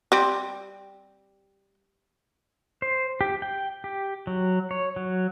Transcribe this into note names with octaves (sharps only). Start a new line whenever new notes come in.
G3 C4
C5
G4
G5
G4
F#3
C#5
F#3